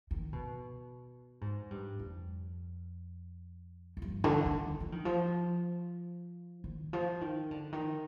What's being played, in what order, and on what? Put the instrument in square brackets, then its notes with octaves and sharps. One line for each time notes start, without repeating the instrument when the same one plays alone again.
[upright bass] D#3
B2
G#2
G2
F2
F2
G2
D3
D#3
F3
D#3
F3
D#3
F3
D#3
D3
D#3